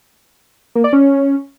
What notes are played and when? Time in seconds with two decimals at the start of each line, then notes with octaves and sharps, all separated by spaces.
0.75 A#3
0.84 D5
0.93 C#4